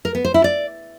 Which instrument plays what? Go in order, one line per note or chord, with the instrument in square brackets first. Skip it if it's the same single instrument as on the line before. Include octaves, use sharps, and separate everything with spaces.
[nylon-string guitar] A#4
B3
C5
E4
D5